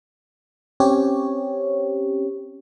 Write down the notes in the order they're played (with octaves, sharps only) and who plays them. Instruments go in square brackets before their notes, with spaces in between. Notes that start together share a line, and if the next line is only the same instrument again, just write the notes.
[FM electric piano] C4 C#4 G4 C#5